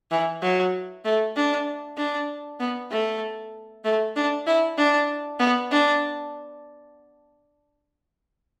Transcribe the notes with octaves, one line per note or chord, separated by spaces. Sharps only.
E3
F#3
A3
D4
D4
B3
A3
A3
D4
E4
D4
B3
D4